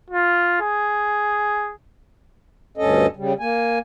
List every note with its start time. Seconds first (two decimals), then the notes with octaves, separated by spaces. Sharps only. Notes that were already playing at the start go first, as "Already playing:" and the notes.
0.10 F4
0.61 G#4
2.78 D2 G2 C#4 A4 D#5
3.16 C#3 G3
3.40 A#3 G#5